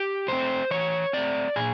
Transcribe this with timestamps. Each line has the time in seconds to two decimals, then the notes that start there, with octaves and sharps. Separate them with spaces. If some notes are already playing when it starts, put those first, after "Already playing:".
Already playing: G4
0.28 A3 C4 C5
0.71 E3 C#5
1.13 A3 C4 D5
1.56 A#2 G#4